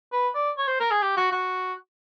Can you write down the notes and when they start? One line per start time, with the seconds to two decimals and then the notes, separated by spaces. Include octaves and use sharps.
0.13 B4
0.34 D5
0.57 C#5
0.68 C5
0.80 A#4
0.91 G#4
1.02 G4
1.17 F#4
1.32 F#4